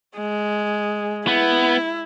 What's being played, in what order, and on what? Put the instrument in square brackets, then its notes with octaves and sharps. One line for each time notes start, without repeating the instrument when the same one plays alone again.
[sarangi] G#3
[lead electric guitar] B3 [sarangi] E4